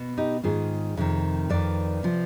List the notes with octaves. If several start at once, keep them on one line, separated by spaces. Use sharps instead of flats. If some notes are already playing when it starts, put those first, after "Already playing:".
Already playing: B2
D#4 G4
G#2 D#3 F4 G#4
F2 C3 D#3
F2 D#3 B4 D5
C3 F3